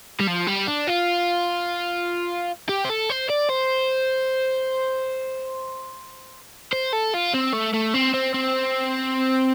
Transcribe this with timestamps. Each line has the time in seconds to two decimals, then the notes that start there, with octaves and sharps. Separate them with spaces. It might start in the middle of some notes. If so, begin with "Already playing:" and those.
0.20 G3
0.28 F3
0.47 G3
0.67 D4
0.87 F4
2.69 G4
2.85 C5
2.89 A4
3.10 C5
3.30 D5
3.50 C5
6.73 C5
6.93 A4
7.14 F4
7.34 C4
7.53 A3
7.74 A3
7.94 C4
8.14 C4
8.34 C4